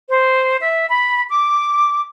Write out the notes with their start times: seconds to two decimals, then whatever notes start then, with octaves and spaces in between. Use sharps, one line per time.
0.09 C5
0.60 E5
0.89 B5
1.29 D6